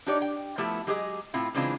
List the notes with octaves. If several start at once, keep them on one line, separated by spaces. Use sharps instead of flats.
D4 D#4 G4 C#5 D5
G5
F3 A3 B3 E4 G4 E5
F#3 G#3 G4 G#4 B4 D#5
A2 C4 E4 F4
C#3 E3 G#3 C4 D4 F4